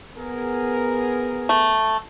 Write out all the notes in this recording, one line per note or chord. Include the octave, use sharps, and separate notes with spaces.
B3 G#4 A#4
A3